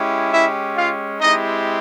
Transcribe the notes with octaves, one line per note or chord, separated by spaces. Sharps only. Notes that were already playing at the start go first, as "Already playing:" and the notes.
Already playing: G#3 C#4 E4 G4
E4 E5
F4 F5
G#3 C4 D#4 E4 G4 D#5